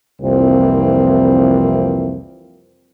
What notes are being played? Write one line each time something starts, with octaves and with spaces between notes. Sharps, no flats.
C2 F2 E3 F3 A#3 C4